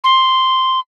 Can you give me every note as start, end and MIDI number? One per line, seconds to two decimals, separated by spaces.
0.04 0.80 84